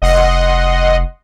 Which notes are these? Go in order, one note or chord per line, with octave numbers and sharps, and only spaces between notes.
F1 D#5 F#5 C6